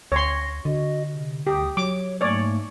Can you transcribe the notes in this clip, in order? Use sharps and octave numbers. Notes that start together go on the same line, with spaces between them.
D2 C#5 C6 A#6
D3 F#4 D#5
C3
D2 G4 G5 D#6
F#3 C#5 D6
G#2 A3 A#3 C#5 D5